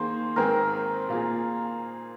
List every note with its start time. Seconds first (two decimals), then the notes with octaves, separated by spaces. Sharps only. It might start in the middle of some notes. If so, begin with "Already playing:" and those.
Already playing: D#3 A#3 G#4 C5
0.36 G#2 D#3 C4 G#4 A#4
1.09 A#2 A#3 F4 G#4